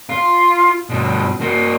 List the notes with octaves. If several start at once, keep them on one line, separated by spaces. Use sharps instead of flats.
F4
G2 B2
A#3 F#4